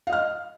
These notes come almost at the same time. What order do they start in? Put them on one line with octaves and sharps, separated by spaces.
F5 D#5 F6